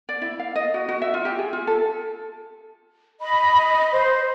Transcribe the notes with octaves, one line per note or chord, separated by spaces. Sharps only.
D5
E4
F5
D#5
F#4
F#4
E5
F4
G4
G#4
F4
A4
D#5 B5
C5